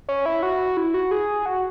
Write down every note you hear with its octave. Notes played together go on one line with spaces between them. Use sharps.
C#4
E4
F#4
E4
F#4
G#4
F#4